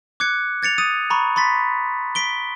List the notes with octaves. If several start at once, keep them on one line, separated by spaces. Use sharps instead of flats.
D6 F#6 G#6 C#7
G#6 A6 C#7 F7
D#6 A6 D#7
A#5 B5 C#6
B5 C6 A6 B6
B6 D7 G7